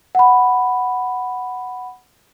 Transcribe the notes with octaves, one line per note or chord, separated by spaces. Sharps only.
F#5 B5